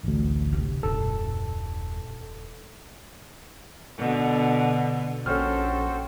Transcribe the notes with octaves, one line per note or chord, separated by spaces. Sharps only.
A1 D2
C3 C4
D#1 F#2 A4
B2 D3
A#1 C#4 F#4 A4 C5 G5 F6